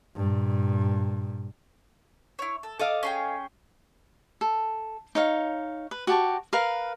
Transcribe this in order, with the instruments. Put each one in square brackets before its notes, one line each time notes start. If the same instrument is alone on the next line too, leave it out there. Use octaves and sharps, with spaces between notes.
[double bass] G2 A#2
[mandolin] E4 C#5
A4
[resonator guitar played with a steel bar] A4 D#5 F5 [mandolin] D6 E6
[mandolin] C#4 G#4 G5
[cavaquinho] A4
D#4 C#5 F5
B4
F#4 G4 A5 C#6
A#4 B4 F5